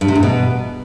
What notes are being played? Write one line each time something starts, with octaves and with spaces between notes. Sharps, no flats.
G2
C3
E2
B2